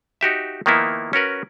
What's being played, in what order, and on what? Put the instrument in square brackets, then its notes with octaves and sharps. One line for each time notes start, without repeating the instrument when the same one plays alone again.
[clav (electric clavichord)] D#4 F#4 G4 E5
D#3 F3 A#3 B3 D#4 E4
C#4 F#4 A#4 B4